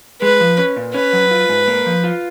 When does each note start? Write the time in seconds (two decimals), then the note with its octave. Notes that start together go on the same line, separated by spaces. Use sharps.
0.22 G#3 B4
0.40 F3
0.58 C#4
0.77 A#2
0.94 C#4 B4
1.13 F#3
1.31 F4
1.49 G#2
1.68 A#3
1.86 F3
2.04 F4